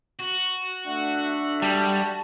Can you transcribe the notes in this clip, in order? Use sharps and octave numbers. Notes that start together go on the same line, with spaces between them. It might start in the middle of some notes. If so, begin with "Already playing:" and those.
F#4
A3 D4 E5 F#5
G3 A5